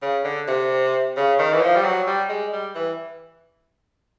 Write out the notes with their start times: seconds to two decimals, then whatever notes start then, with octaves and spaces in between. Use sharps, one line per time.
0.02 C#3
0.24 D3
0.47 C3
1.17 C#3
1.39 D#3
1.53 E3
1.61 F3
1.76 G3
1.84 F#3
2.07 G3
2.29 G#3
2.52 G3
2.75 E3